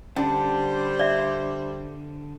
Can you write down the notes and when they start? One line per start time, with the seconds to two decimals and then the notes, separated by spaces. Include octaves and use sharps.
0.16 D3 G3 C#4 D4 C5
0.99 D5 E5